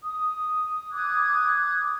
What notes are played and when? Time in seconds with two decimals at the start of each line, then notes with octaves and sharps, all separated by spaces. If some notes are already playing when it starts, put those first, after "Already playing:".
0.04 D#6
0.93 D6 D#6 F#6 G#6